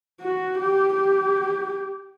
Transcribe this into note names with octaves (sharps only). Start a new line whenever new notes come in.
F#4
G4
G4